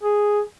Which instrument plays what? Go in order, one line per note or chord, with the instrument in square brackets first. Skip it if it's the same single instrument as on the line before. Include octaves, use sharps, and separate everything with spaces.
[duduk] G#4